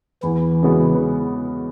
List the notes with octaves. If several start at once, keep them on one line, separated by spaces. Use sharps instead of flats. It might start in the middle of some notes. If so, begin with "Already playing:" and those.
E2 E3 E4
C#3 G#3 B3 F#4